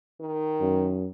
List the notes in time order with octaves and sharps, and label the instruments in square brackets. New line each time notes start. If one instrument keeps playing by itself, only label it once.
[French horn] D#3
[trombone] F#2